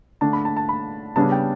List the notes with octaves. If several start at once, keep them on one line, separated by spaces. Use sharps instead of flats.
D3 A3 D4 A5
B5
A5
A5
B5
C#3 G3 B3 D4 A5
G5